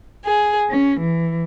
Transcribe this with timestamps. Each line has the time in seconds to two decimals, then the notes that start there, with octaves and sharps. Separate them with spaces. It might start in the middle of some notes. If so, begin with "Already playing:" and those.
0.25 G#4
0.69 C#4
1.00 E3